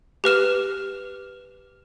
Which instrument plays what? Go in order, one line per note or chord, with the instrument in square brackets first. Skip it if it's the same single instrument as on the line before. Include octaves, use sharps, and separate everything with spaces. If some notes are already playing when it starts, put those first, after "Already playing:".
[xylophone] G4 B4 F6 E7